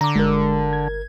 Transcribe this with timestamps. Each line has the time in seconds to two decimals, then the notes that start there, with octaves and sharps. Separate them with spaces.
0.01 D3 A#5 D6
0.15 G1 G#3 A#4
0.73 G#6